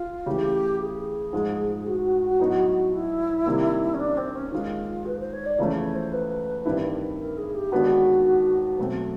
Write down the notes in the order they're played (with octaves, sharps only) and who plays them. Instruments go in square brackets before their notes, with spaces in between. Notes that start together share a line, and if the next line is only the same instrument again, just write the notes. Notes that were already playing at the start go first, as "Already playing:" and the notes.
Already playing: [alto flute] F4
[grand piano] C#3 E3 A3 [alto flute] G4
[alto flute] G#4
[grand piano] G#2 F3 G#3
[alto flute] F#4
[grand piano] A2 F#3 B3 D#4
[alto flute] E4
[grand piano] C3 D#3 G3 A#3
[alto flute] C#4
D4
C4
C#4
[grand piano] D#2 D#3 G#3 [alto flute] F4
[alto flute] B4
C5
C#5
D5
[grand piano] E2 C#3 F3 A3 C#4
[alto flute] C#5
C5
B4
[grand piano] G2 D#3 G3 C4 E4
[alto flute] A#4
G#4
G4
[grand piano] D#2 D#3 G#3 B3 D4 [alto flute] F#4
[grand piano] B2 F#3 A3 C4